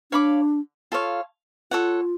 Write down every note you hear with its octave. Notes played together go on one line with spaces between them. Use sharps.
D4 C#5 F5 B5 D6
F4 A4 C#5 F5
F4 A4 C#5 F#5